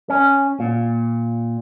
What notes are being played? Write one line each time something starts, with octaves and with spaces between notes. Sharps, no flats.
C#4
A#2